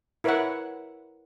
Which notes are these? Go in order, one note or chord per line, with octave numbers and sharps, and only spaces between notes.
E4 A#4 B4 C#5 E5 F#5